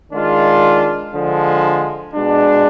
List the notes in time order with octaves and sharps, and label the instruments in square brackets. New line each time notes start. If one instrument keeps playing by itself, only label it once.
[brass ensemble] D#3 G#3 D4 F4
D3 F3 G#3
B2 G#3 D4